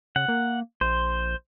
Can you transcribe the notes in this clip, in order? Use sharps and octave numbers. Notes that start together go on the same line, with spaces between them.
C#3 F#5
A#3
A#1 C5